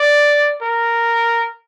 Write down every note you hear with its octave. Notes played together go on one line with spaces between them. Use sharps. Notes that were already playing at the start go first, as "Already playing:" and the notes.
Already playing: D5
A#4